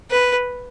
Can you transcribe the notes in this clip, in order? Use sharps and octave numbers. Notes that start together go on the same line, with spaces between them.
B4